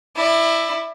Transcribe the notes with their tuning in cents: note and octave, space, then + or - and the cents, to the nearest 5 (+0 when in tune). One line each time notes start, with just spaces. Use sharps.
E4 +0 D5 +25